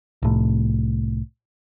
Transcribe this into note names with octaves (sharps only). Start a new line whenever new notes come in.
C2 A2